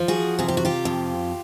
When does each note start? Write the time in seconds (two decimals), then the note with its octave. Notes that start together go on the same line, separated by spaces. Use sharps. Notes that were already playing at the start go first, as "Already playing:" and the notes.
Already playing: F3
0.08 F#4 G#4
0.39 C3 G#4
0.48 G4
0.57 F#4
0.65 F4 G4
0.85 F2